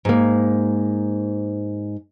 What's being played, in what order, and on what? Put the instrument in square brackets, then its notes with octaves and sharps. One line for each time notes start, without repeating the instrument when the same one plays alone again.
[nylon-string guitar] G#2 A#3